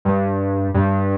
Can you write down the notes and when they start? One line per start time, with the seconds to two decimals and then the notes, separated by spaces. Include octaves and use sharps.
0.05 G2
0.74 G2